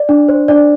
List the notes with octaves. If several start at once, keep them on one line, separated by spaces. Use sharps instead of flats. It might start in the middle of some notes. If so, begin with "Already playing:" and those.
Already playing: D5
D4
C5
D4 D5